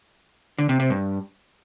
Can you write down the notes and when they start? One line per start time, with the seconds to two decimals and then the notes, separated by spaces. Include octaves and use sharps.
0.58 D3
0.69 C3
0.80 C3
0.90 G2